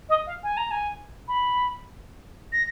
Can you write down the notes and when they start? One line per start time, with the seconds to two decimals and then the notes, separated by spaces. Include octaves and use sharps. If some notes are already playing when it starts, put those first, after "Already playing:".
0.09 D#5
0.27 F5
0.43 G#5
0.57 A#5
0.71 G#5
1.28 B5
2.53 A#6